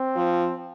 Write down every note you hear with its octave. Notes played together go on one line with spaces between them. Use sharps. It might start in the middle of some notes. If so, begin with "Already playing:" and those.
Already playing: C4
F3